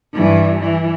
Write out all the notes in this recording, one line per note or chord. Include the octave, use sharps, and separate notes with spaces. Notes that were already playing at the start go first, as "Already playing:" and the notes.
G2 E3
E3